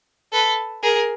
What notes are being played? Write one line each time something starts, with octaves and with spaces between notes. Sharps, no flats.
A4 B4
G#4 A#4